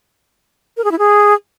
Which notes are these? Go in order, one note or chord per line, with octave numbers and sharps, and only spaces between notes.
A#4
G#4
E4
G#4